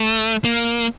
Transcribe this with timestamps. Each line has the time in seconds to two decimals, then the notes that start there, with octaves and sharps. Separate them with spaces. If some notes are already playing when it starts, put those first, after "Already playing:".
Already playing: A3
0.45 A#3